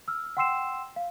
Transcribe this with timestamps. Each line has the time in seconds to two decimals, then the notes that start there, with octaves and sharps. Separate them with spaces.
0.08 E6 F6
0.37 F#5 G5 C6 E6 C7 E7
0.96 F5